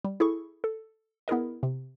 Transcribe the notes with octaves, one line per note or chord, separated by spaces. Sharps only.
G3
E4 G#4 A4 C#6
A4
B3 E4 G#4 A#4 D#5
C3